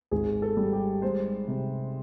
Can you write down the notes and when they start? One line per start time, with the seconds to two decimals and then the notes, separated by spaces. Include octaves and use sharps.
0.11 G#1 G#4
0.42 A4
0.57 G3
0.73 G4
1.02 G#3 C5
1.48 C3